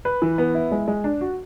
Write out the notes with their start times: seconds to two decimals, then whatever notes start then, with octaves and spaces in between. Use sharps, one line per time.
0.05 B4
0.22 E3
0.38 B3
0.55 E4
0.71 G#3
0.88 G#3
1.04 D4
1.21 F#4